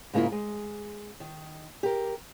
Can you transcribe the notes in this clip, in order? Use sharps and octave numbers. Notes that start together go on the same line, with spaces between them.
G#2 C#3 A#3 E4 F4
G#3
D#3
G4 A#4